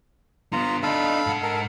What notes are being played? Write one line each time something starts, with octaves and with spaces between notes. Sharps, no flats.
D3 B3 F4 A#5
D4 D#4 A4 F5 B5
G#2 F#5
A4 A#4